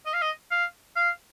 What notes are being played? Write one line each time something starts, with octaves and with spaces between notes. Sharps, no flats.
D#5
F5
D#5
F5
F5